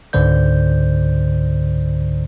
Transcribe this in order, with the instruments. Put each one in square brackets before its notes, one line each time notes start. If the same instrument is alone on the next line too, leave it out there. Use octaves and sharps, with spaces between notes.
[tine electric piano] C#2 G#2 D3 C5 D5 G6